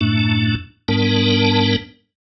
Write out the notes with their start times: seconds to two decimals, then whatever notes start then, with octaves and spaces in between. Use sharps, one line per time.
0.01 F#2 A2 A3 D4
0.88 G#2 G3 B3 D4 A#4 A5